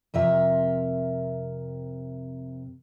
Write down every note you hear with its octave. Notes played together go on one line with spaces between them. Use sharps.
F2 C3 A#4 E5